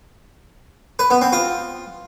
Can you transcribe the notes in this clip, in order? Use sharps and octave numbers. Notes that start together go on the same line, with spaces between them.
B4
B3
C4
F4